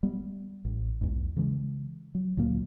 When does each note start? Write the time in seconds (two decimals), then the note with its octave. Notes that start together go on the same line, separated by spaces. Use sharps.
0.03 G3 B3
0.65 A1
1.01 B1 E2 G#2
1.36 C#3 E3 G#3
2.15 F#3
2.37 D2 A#2 F#3 A#3